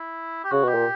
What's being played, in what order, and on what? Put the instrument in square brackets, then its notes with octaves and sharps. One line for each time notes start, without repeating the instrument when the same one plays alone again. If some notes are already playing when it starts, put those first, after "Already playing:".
Already playing: [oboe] E4
G4
[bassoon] C#3 [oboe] F#4
[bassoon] B2 [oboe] G4
[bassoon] A#2